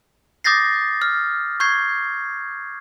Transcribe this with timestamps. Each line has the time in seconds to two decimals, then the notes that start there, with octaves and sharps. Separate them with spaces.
0.44 D6 D#6 G6 A6 A#6 C7
1.02 F6
1.60 C#6 G6 G#6 C7